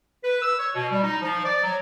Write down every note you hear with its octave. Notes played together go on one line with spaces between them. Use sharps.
B4
E6
C#5
B2
G3
D#4
F3
D5
F#3